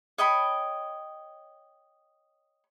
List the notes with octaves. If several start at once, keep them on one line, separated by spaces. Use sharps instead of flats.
C#5 D#5 G5 B5